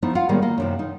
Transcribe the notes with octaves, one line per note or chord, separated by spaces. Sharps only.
F3 A3 B3 D#4 E4
F4 F5 F#5
A2 D#3 G3 G#3 A#3 B3
A#3 D#5
F#2 C3 D#3
D#4